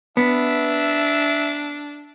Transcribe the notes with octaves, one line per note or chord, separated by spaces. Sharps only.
B3 D4 E5